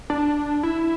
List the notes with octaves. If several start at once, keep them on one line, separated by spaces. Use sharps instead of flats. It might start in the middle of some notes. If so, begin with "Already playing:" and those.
D4
E4